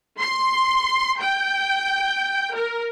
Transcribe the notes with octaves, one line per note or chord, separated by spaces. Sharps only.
C6
G5
A#4